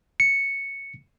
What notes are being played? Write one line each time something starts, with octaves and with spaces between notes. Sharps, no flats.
C#7